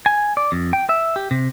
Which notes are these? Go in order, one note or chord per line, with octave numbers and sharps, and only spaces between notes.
G#5
D5
F2
G5
E5
G4
C3